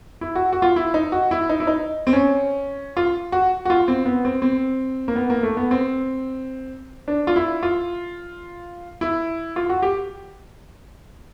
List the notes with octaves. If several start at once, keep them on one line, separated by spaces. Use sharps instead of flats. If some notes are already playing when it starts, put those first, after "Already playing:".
E4
F#4
F#4
F4
E4
D#4
F#4
E4
D#4
E4
D#4
C4
C#4
F4
F#4
F#4
F4
C4
B3
C4
C4
A#3
B3
A#3
A3
B3
C4
D4
F4
E4
F4
E4
F4
F#4
G4